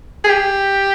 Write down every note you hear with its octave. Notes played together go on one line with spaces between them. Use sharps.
G#4
G4